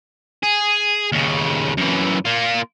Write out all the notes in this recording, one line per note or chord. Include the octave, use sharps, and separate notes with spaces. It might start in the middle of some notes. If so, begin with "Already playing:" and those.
G#4
D#2 C#3
F#2 E3
A#3 F4